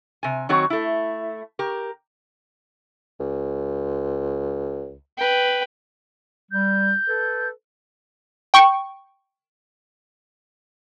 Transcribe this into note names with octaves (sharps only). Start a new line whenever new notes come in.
C3 G#5
D#3 F#3 C4 F#4 C#5
A3 E4
G4 A#4
C#2
B4 G5
G3 G6
A4 B4
G5 C#6